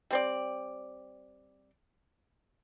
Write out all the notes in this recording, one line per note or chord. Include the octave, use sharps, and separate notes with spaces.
G3 C4 D5